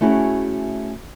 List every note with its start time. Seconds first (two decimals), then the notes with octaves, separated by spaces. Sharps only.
0.01 A3 C#4 E4 F#4 G#4